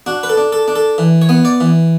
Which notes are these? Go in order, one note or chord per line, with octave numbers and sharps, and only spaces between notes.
D4 F#4
B4
A4
D4
A4
D4
A4
E3
C#5
B3
D5
E3